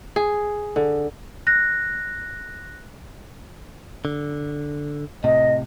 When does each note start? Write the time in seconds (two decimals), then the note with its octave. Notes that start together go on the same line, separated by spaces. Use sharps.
0.16 G#4
0.76 D3
1.47 F#6 A#6
4.05 D3
5.24 A2 C3 D#5